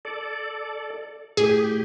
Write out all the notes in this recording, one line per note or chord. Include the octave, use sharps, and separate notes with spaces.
A4 D5
A2 G4 G#4